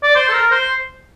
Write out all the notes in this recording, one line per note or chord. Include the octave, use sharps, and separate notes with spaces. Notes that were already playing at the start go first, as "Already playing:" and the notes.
D5
C5
A4
A#4
C5